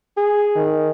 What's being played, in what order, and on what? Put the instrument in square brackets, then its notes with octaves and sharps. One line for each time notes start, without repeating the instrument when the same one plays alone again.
[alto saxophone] G#4
[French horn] D#3